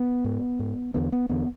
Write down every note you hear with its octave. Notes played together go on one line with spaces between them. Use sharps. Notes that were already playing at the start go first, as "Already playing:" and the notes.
Already playing: B3
G#2
G#2
E2 D3 B3
B3
E2 D3 B3